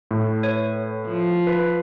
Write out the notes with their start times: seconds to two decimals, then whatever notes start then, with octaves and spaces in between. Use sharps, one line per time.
0.11 A2
0.43 B4 C#5 D#7
1.06 F3
1.47 B4